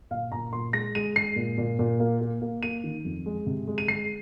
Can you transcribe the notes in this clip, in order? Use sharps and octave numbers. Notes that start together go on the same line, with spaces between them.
A#2 F5
A#2 A#5
A#2 C6
G#3 A#6
G#3 D#7
G#3 C7
A#2
A#2
A#2
A#3
A#3
A#3
A#3 D#7
D#3
F2
G#3
C3
G#3
D#7
G#3 C7